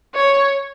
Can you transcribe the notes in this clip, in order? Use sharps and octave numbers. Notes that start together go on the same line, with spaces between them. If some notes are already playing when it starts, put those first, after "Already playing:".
C#5